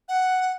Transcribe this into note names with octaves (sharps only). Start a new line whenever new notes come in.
F#5